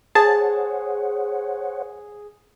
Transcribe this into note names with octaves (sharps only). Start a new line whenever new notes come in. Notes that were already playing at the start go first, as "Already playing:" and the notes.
G#4 C5 C#5 F#5 A5